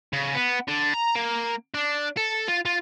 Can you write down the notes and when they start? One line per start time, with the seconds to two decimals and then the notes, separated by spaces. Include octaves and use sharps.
0.13 C#3
0.35 B3
0.68 D3
0.94 A#5
1.16 A#3
1.74 D4
2.17 A4
2.48 F4
2.66 F4